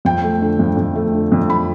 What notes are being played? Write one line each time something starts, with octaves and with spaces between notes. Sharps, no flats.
F2 G5
A3
D3
F2
F2
A3
D3
F2
B5